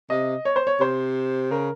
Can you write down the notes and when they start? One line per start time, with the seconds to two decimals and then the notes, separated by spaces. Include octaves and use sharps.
0.10 C3 D#5
0.45 C#5
0.56 C5
0.67 C#5
0.80 C3 C5
1.51 C#3 A#4